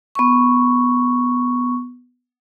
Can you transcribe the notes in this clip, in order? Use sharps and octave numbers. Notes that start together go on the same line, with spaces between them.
B3 C#6